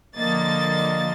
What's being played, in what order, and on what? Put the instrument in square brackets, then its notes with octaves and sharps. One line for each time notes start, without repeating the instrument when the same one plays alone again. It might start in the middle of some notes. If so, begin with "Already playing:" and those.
[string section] D3 F3 A#3 D#5 A6